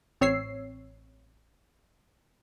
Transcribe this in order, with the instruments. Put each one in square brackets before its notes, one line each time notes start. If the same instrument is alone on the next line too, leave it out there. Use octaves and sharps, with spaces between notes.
[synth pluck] A1 C4 C#5 E6 C7